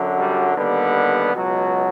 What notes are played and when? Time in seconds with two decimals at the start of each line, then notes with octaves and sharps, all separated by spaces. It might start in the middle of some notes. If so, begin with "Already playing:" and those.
Already playing: F#2 D3 F#3
0.18 G3
0.57 D#2 D3 G3 B3
1.34 C#2 B2 F#3